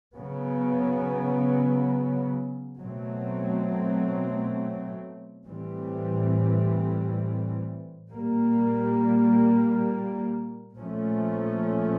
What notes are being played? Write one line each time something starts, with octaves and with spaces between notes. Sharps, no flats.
C#3 F#3 B3
B2 F#3 A3 C4
A2 E3 G3 C4
A#2 G3 A#3
A#2 F3 A3 C#4